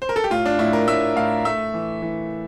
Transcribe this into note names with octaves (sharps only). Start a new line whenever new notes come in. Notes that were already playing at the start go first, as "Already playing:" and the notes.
C5
A#4
A4
G4
A2 F4
D4
A2 E4
A#4
A2 E5
A2 F5
A3 E5
E3
E3